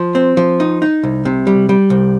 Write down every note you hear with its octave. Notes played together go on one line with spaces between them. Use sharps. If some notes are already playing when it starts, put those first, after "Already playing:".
Already playing: F3
C4
F3
D#4
D#4
C2
C3
G3
G3
C2